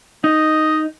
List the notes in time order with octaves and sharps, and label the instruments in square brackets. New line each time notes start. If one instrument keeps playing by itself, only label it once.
[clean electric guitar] D#4 [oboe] D#5